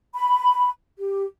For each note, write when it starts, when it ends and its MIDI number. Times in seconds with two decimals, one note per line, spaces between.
0.15 0.69 83
0.99 1.24 67